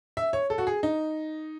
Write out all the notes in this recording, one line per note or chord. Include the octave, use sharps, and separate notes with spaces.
E5
C#5
A4
F#4
G#4
D#4